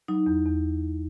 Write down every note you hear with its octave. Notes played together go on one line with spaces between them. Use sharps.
F#3 D#4
E2
E2